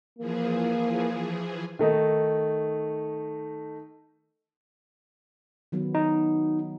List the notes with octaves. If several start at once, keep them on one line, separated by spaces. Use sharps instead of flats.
E3 F3 A#3 G#4
D#3 A3 D#4
D#3 F#3 B3
D#4